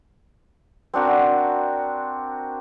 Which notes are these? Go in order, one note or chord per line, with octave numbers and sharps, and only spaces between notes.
C4 D4 F#4 A#4